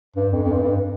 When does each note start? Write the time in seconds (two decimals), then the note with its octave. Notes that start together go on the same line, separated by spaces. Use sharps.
0.16 G2
0.32 F2
0.43 F2
0.52 G2
0.63 G2